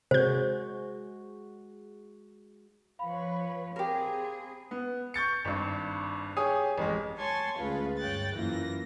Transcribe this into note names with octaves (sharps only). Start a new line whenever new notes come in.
C3 G#3 F#4 C5 G6
F3 B4 C#5 F5 B5
C4 G4 G#4 A#4
B3
C#6 G6 A6 C#7
G#1 G2
G4 G#4 C#5 G#5 D#6
A1 F2 G#3
C#5 G#5 A5 C6 C#6
D2 G#3 C#4 F4 B4
G2 C#5 G5 F#6 A6
F#2 E3 A#3 F4 A#6